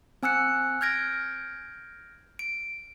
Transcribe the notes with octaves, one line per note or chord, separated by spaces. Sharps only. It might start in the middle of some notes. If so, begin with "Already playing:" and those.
C4 G#5 E6 F#6 C#7
F6 G6 G#6 A#6 D7
D7